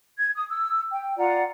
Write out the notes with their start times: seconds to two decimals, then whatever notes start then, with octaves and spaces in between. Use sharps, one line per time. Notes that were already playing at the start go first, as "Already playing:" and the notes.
0.16 G#6
0.35 D#6
0.48 E6
0.89 G5
1.17 F4 D5 F#5 A#5